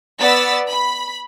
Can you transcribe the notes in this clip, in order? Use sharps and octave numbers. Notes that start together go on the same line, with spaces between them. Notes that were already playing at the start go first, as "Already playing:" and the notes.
B3 D5 E6 A6 B6
B5